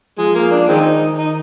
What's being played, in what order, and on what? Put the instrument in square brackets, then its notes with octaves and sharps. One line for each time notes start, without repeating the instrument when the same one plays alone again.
[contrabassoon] F3 [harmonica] G#3
[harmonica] A#3
D4
[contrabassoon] D#3 [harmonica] G#3 C4 D#4
[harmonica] D#4